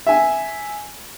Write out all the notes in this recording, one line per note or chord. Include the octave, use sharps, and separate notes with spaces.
E5 G#5